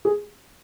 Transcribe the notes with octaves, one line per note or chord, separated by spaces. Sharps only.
G#4